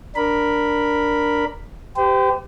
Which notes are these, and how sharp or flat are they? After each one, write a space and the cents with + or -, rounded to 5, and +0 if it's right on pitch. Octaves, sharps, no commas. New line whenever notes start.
D4 +0 A#4 +0 B5 +0
G4 +0 C5 -45